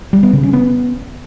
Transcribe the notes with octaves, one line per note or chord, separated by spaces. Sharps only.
G3
B3
C#3
C#4
B3